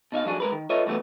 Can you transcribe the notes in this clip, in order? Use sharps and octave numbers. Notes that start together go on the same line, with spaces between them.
B2 D#4 E5 F5
D3 F3 F#3 D4 G#4
G#3 A#4 B4
D#3
F4 A4 B4 C#5 D#5 E5
G2 E3 F#3 A3 B3